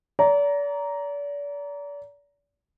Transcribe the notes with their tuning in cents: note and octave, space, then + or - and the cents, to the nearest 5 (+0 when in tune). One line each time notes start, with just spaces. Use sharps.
D5 -40 A#5 +0